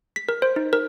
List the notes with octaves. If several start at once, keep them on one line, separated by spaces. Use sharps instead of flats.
B6
A#4
C5
D#4
A#4